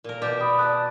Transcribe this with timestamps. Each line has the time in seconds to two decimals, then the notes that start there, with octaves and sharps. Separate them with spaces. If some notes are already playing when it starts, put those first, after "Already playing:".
0.04 A#2 A#4
0.22 B2 G4 D5
0.40 B5 D#6
0.59 D5 A5 D#6 F#6